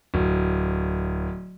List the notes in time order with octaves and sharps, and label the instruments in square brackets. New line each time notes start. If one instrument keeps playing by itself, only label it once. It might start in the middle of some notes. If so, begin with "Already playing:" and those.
[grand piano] D1